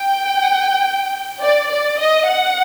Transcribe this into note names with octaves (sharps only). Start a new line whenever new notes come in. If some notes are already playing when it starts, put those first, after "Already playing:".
Already playing: G5
D5
D5
D#5
F#5